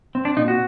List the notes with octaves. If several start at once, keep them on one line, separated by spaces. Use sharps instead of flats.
C4
D4
A#2 D#4
F#4